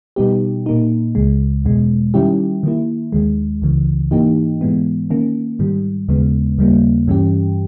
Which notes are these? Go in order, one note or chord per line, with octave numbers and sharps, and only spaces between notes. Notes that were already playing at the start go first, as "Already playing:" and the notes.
B2 G3 B3 D#4 G4
A#2 A#3 D#4
C#2 C#3 G#3
E2 B2 G#3
D#3 G3 C#4 E4 G4
D#3 A#3 E4
D#2 D#3 G#3
C#2 C#3 E3
G#2 E3 A#3 D#4 G4
G#2 E3 G#3 B3
D#3 A#3 C#4
G#2 D#3 G3
D#2 C#3 G#3 B3
D#2 C#3 G3 A#3
G2 E3 G3 C#4 G4